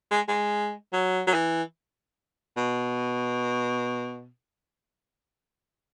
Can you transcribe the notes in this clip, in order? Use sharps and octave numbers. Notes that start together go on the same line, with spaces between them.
G#3
G#3
F#3
F#3
E3
B2